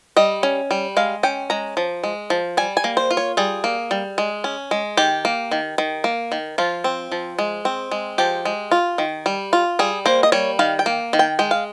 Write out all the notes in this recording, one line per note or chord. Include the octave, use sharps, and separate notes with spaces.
G3 D#5
C#4
G3
G#3 F5
C#4 G5
G#3 A#5
F3
G#3
F3
G3 G#5
G#5
A#3
C5
F4
C#5
G3 G#4
A#3
G3
G#3
C#4
G#3
D#3 G4
A#3
D#3
D#3
A#3
D#3
F3 F4
C4
F3
G#3
C4
G#3
F3 G4
G#3
F4
D#3
G3
F4
G3 G#4
A#3 C5
D#5
G3 C#5
D#3 F5
G5
A#3
D#3
G5
G#3 G5
F5